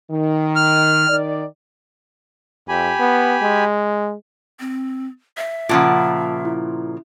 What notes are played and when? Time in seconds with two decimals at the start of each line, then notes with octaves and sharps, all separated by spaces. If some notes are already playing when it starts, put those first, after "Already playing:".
0.10 D#3
0.56 F6
1.09 D#3 D5
2.69 F2 G4 G#5 B5
2.99 B3
3.42 G#3
4.60 C4
5.37 E5
5.69 A#2 C#3 F3 F4 A#4 F#5 A5 E6
6.45 E4